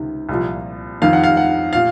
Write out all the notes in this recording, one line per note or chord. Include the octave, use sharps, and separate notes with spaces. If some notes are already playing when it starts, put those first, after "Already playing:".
Already playing: C#2 C3 D#3
C2 A#2 F3
F2 D#3 F5
F#5
F5
F#5
A#2 F5